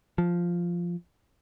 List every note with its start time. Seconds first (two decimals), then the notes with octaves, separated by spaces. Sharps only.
0.18 F3